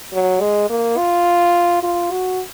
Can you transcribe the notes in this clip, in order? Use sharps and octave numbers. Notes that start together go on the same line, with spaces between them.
F#3
G#3
A#3
F4
F4
F#4